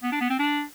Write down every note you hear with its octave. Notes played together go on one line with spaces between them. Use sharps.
B3
D4
B3
C4
D4